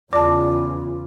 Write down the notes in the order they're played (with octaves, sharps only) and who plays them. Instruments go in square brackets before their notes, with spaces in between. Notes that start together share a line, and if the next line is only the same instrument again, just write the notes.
[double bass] E2 C#3 [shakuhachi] F4 [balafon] D5 A5 [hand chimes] D6